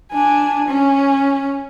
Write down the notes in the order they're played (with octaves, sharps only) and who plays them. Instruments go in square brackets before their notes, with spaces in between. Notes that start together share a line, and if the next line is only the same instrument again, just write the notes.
[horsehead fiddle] D4 G#5
C#4